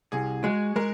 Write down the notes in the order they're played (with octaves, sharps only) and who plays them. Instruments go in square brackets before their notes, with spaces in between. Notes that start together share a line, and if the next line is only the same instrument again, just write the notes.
[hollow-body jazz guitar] C2 [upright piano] G#4
[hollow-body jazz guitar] G#3 [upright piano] F#4
[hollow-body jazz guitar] G#3 [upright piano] A#4